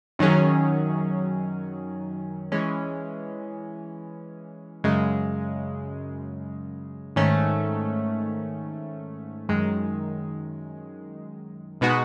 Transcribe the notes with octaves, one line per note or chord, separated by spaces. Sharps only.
F#2 D#3 F#3 C#4 G#4
E3 G#3 C#4
F#2 C#3 G#3
G#2 D#3 A3 C#4
F#2 D#3 G#3
B2 G#3 B3 D#4 F#4